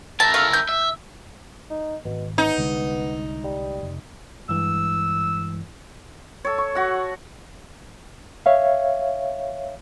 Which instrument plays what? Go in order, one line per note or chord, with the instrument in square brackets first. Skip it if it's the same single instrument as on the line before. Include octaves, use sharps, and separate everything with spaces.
[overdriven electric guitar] E4 A#4 [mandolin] A5
[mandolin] A3 F5
G6
[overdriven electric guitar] E5
[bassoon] D#4
[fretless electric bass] G#1 [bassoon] B2
[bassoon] B3 [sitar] D#4
[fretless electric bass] C2 D3 G#3
[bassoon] G3
[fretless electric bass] F1
[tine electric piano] G2 E3 G#3 [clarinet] E6
[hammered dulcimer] A4 C#5
C#6
F#4 F#5
[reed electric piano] C#5 E5 F5